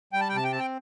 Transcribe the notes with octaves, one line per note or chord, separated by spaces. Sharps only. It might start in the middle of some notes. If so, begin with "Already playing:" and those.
G3 G5
A5
G5
C3 A5
G5
C4 A5
G5